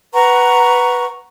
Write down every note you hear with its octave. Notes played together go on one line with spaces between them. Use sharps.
B4 F#5 A#5 C#6